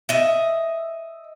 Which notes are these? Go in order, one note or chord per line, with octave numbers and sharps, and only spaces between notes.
D#5 E5